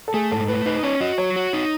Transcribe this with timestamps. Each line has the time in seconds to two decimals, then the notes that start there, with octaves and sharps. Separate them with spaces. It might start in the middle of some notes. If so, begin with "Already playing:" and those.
0.08 A4
0.14 A3 G#4
0.32 G#2 A4
0.48 A3 B4
0.66 D#4 B4
0.76 B4
0.83 C#4 C#5
1.01 F#4 D#5
1.18 F#3 C#5
1.36 F#4
1.53 D#4